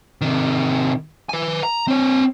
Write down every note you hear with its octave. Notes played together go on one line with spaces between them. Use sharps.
C3 D#3
B4 G#5
A#5
C4 C#5